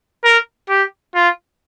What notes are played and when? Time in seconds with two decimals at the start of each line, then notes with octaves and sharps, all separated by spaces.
0.24 A#4
0.69 G4
1.15 F4